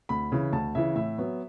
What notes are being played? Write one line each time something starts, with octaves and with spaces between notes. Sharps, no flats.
D2 B5
C#3 E3
D2 A5
C#3 E3 E5
A2 E5
F#3 B3